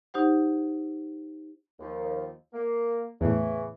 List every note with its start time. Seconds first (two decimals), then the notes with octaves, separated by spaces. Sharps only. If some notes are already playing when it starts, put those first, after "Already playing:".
0.14 D#4 G4 C5 F#5
1.79 D#2 F3
2.53 A#3
3.21 E2 A2 C#3 E3